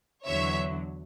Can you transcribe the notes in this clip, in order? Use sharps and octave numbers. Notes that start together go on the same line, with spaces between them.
E2 D3 F#3 C#5 E5